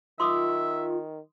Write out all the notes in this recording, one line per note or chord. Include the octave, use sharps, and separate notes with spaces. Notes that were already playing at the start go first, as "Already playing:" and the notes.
D#3 F4 E5 C6 D6 D#6